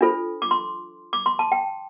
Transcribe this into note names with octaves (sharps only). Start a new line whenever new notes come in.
D4 F4 A4 C5
D6
C6
D6
C6
A5
G5